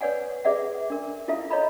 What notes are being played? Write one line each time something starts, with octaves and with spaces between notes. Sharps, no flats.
B4 C#5 D5 F#5 G#5
G#4 B4 D5 E5 F#5
D4 A#4
E4 F4 A4 E5 F5
C#5 D#5 A#5 B5